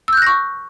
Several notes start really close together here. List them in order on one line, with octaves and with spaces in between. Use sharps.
E6 G6 F#6 A#6 C#6